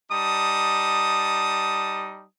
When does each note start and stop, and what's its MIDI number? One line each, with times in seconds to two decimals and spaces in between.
0.12 2.24 55
0.12 2.24 63
0.12 2.24 81
0.12 2.24 87